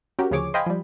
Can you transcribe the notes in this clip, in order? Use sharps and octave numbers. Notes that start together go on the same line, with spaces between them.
C#4 F#4 G4 A#4
D2 C#3 F3 G#4 C#5 D6
C5 D#5 F5 G5 G#5 B5
F3 G3